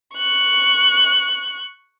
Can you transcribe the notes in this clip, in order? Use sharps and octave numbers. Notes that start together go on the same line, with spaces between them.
C#6 F#6